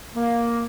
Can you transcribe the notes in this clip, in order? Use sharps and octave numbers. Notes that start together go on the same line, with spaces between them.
A#3